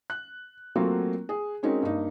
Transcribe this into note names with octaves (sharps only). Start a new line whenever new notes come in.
F#6
F#3 A3 A#3 C4 F4 F#4
G#4
G#3 C4 C#4 D#4 F#4 A#4
G2 A#3 D#4